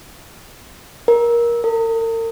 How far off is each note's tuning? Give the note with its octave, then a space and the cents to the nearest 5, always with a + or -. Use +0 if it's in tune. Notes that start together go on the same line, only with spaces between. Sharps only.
A#4 +15
A#4 -45